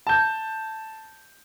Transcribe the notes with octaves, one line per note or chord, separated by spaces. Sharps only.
A5 G6